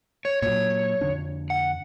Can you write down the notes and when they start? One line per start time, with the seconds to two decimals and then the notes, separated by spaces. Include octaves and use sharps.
0.25 C#5
0.42 A#2 F#3 C#5
1.01 F2 D3 D4
1.50 F#5